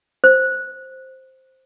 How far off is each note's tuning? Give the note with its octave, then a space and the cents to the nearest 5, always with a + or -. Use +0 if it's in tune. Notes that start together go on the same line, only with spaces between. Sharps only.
C5 +5